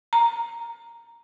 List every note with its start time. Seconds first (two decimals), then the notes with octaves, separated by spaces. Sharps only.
0.13 A#5